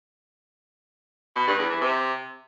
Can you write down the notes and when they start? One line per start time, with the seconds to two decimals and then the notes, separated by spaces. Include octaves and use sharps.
1.36 B2
1.47 G2
1.58 E2
1.70 E3
1.81 C3